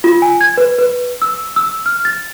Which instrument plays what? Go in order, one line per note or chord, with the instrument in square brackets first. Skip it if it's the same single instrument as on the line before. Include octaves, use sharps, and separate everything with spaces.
[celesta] F4
G#5
G#6
B4
B4
E6
E6
F6
A6